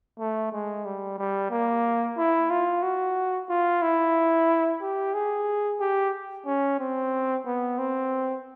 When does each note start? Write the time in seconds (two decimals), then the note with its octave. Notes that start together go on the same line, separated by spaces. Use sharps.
0.19 A3
0.52 G#3
0.85 G3
1.18 G3
1.51 A#3
2.17 E4
2.50 F4
2.83 F#4
3.49 F4
3.82 E4
4.81 G4
5.14 G#4
5.80 G4
6.46 C#4
6.80 C4
7.46 B3
7.78 C4